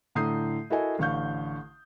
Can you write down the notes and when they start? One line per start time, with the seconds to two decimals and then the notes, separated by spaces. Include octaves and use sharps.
0.15 A2 D3 A#5 D#6 G6 C7
0.70 E4 F#4 A4 A#4 D#5 G#5
0.99 A1 D3 F5 C#6 G6